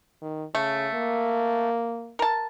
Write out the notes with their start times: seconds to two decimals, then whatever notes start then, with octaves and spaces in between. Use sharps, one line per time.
0.22 D#3
0.55 C#3 A3
0.94 A#3
2.19 A#4 A5